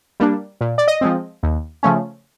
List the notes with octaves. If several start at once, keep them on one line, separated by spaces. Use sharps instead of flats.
G3 A#3 D4
A#2
D5
D#5
F3 G#3 C4
D#2
C#3 F3 A3 C#4